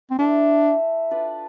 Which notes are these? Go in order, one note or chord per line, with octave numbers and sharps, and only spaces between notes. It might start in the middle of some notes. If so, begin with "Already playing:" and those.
C4
D4 E4 A4 E5
D4 F4 B4 D5